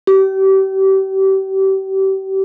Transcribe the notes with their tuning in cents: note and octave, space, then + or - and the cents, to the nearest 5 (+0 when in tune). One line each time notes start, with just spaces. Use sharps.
G4 -35